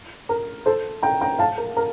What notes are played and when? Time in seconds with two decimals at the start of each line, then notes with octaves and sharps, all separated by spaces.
0.29 A#4
0.66 A4 C5
1.03 G5 A#5
1.21 G5 A#5
1.39 F5 A5
1.58 A#4
1.77 A#4